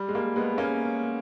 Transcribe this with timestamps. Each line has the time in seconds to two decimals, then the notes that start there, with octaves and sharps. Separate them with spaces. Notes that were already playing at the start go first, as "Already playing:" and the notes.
Already playing: G3
0.08 G#3
0.15 G3 A#3
0.36 G#3 B3
0.58 A#3 C#4